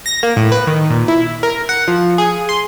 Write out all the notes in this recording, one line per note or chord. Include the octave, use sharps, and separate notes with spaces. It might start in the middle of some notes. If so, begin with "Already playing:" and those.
A#6
A#3
A2
B4
D#3
A#2
E4
A#4
F#5
F3
G#4
C6